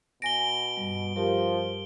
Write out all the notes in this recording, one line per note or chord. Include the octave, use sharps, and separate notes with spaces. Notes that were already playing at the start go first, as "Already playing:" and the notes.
B2 G#5 A#6 D7 G7
G2 G3
F3 G4 A#4